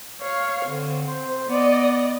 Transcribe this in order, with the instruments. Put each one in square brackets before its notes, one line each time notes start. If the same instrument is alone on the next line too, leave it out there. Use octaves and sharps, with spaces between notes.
[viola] C#5 F5
[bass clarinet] D3 [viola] C4
[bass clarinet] C5
[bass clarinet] B3 [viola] D5 D#5